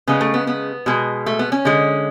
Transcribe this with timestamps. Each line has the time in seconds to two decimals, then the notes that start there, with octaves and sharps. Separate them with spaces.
0.07 C#3 G#3 B3
0.21 A3
0.34 B3
0.47 B3
0.86 B2 G#3
1.26 A3
1.39 B3
1.52 C#4
1.65 D3 G#3